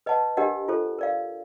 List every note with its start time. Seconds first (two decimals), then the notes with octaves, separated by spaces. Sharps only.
0.06 B4 D#5 F#5 A5
0.37 D4 G4 A#4 D#5 F#5
0.68 F4 A4 C5
0.99 A#4 D5 F5